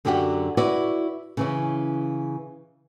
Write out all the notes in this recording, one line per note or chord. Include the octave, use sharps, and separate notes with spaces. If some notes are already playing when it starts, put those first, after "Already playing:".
F#2 D3 F#3 G4 D5 F#5
E4 F#4 B4 C#5 D5
C#3 E3 C#4